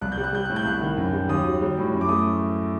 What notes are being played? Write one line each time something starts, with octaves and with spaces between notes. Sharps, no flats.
C2 F#6
G6
G3
F#6
G3 G6
A2 F#6
G6
C2 F#6
D#3
F#2
G3
D#2 D#6
F#3
G3
A2
F#2
D6
A3 D#6